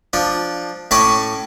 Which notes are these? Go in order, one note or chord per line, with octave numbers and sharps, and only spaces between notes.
F3 D4
A2 C#4 A5 B5 C#6 D6